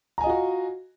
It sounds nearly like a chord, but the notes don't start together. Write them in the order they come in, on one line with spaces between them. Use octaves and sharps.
A#5 G#5 D#5 F4 F#4